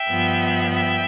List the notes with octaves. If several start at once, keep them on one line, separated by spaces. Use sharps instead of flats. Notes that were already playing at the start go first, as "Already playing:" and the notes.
Already playing: E5 G5
G2 F3 B3
E5 G5